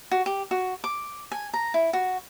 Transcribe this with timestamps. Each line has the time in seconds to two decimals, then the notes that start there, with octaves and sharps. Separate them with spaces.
0.11 F#4
0.26 G4
0.51 F#4
0.84 D6
1.32 G#5
1.54 A#5
1.74 E4
1.93 F#4